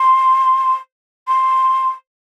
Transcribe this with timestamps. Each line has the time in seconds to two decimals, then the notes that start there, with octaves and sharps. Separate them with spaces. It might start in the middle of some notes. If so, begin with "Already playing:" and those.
Already playing: C6
1.28 C6